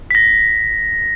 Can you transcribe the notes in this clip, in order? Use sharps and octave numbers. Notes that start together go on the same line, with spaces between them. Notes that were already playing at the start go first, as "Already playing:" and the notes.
A#6 B6